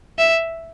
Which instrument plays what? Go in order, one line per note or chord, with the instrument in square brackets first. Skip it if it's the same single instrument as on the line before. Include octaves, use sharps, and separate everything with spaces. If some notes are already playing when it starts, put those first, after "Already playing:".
[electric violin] E5